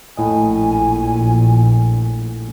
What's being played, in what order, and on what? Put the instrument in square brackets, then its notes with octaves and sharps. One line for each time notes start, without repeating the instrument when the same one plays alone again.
[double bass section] A#1 [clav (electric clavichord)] A2 D#5 [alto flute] G#5